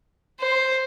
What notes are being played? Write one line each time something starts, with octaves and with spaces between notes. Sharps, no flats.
C5